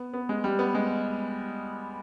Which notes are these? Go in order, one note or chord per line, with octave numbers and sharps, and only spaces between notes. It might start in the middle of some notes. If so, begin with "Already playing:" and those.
Already playing: B3
B3
G#3
G3
B3
G#3